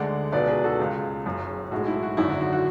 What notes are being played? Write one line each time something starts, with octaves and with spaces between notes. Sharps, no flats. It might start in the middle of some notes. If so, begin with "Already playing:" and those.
Already playing: D2 D3 G#3 D5 F#5
C#2 B2 F#3 B4 D5
G#4 B4
F#4 A4
C#2 C#3 G#3
F#1 F#2 C#3
B1 A2 G#3 F#4
E4
F#4
G#1 F#2 D3 E4
F#4
F#4
F#4